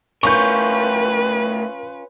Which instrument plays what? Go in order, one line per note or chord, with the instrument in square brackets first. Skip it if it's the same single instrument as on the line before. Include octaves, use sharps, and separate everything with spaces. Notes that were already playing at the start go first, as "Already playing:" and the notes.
[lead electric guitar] A2 A#4 [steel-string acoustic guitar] C#4 F4 [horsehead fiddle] B4 [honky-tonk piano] C#6 G6